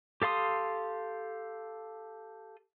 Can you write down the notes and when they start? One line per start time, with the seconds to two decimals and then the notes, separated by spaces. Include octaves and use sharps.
0.22 G4 A4 F5 C6 D#6